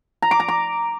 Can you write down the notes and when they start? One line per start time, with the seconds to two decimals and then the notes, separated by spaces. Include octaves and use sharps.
0.22 A#5
0.31 D6
0.40 A#5
0.48 D6